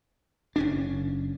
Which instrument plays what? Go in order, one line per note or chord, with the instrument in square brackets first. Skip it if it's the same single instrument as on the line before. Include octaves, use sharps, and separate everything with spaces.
[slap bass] F#1 C#4 D4